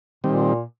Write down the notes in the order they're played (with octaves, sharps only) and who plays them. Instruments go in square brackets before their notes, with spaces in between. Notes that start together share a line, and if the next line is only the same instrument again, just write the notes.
[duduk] A#2 [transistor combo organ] D#3 G3 C4